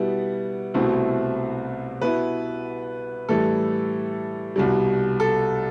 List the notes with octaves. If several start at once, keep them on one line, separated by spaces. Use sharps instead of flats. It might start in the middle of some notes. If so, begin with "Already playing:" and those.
Already playing: B2 G3 B3 E4
C2 B2 A3 C4 E4
B2 B3 E4 B4
A2 E3 G3 A4
C2 B2 G3
A4